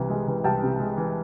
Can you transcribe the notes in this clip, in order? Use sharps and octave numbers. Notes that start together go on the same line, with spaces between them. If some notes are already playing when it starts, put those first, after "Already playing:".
Already playing: C2 C3 E3
G#3
E3
C2 G5 A5
C3
G#3
E3